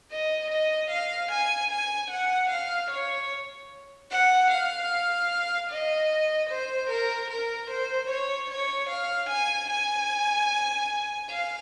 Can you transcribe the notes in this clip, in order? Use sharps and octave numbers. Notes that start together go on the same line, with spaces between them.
D#5
D#5
F5
G#5
G#5
F#5
F5
C#5
F#5
F5
D#5
C5
A#4
A#4
C5
C#5
C#5
F5
G#5
G#5
F5